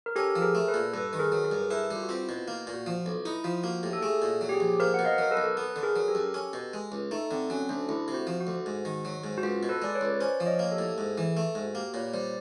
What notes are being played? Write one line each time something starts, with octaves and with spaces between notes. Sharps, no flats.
A#4
C#4 G4 A4
F3
G#4 A#4
A3
A4 B4
A#2
G2 A4 B4
D#3
G#4 A#4
F#3
G#4 A#4
G2
E4 A4 B4
G3
F4
F#4
C4 F4
E4
B2
A#3
A#2
F#4
F3
F4
B1
D#4 E4
F3 F4
A#3 F#4
A2 G4
A4
A3 G#4
A#2
F#3
G4
G#4
A#1
A#3 A#4 C5
B2 F#5
D#5 F5
F#3 A#4
A4 B4
B1
B3 A4 B4
B4
D3
G#4 A#4
F#3
A#4
G4 A4
F#2
C#4
B2
G#3
C#2
A3 D#4
D3 C4
F#3 C#4
D2 D4
D2 E4
C3
F#4
F3
F#4
D2
G#2
D#3
F#3
G#2
F#4
C#2 F4
B2
A4 B4
G#3 D5
B4 C#5
C#2
C#4 C5 D5
F3
C#5 D#5
A#3
G4 A4
A2
G#2 G#4
E3
A3
G#2
F#4
A#3 G4
A#2 B4 C#5
G3 C5 D5